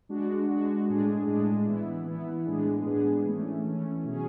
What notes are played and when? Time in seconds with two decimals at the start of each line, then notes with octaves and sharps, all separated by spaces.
0.09 G#3 D4 F#4
0.48 G#3 D4 F#4
0.87 A2 G#3 D4 G#4
1.27 A2 G#3 D4 G#4
1.66 E3 B3 E4
2.06 E3 B3 E4
2.45 A2 G#3 B3 D4 G#4
2.85 A2 G#3 B3 D4 G#4
3.25 E3 A3 C#4
3.64 E3 A3 C#4
4.04 B2 F#3 C#4 G#4